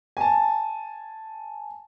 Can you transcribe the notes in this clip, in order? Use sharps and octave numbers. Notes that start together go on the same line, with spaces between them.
G#5 A5